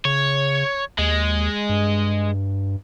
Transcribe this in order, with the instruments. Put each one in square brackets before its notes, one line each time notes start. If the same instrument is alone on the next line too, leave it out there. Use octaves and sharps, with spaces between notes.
[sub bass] C#3 [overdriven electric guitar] C#5
[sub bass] D#2 [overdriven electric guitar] G#3
[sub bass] G2